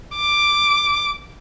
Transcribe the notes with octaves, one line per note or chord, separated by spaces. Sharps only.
D6